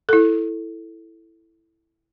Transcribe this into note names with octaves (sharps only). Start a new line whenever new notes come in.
E4 A4